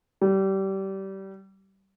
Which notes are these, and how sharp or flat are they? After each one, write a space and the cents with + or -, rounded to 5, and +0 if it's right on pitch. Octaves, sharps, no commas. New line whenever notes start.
G3 -25